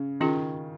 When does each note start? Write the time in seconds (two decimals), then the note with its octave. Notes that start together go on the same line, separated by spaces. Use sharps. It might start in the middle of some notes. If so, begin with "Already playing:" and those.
Already playing: C#3
0.20 D#3 C#4 F4 G#4